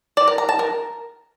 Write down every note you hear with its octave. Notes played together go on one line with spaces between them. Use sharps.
D5
A#4
A#5
A5
A#4